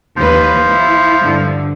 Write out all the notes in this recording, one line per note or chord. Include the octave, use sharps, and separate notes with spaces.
D#2 E3 F3 B4
E4
G2 D3